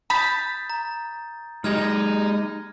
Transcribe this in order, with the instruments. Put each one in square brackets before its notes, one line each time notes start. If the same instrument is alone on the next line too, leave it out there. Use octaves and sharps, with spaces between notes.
[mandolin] B5 [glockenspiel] D#6 G6 A6
[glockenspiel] A#5
[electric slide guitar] G#3 G4 G#4 [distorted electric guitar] D#4 D#5 [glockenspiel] F6 G#6 A#6